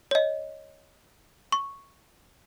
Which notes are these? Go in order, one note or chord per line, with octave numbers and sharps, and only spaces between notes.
C#5 D#5
C#6